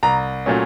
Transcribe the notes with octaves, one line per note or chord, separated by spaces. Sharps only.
C2 A#5
A#2 F#3 A3 C#4